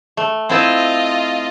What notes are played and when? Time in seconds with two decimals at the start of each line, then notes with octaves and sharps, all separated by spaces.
0.17 A3
0.49 C4 E4 F4 D#5 A5